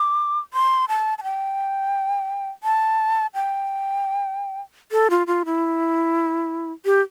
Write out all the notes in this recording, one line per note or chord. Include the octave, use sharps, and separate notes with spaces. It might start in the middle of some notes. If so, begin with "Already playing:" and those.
Already playing: D6
C6
A5
A5
G5
A5
G5
A4
F4
F4
E4
G4